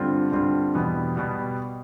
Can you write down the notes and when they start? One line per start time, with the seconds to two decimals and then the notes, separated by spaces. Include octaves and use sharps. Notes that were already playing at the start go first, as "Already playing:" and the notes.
Already playing: G2 D3 G3 C4 F4
0.31 G2 D3 G3 C4 F4
0.74 E2 B2 G3 B3
1.16 B2 G3 B3